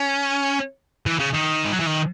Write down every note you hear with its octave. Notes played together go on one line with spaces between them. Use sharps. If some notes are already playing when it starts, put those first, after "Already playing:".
Already playing: C#4
E3
C#3
D#3
G#3
F#3
E3
D#3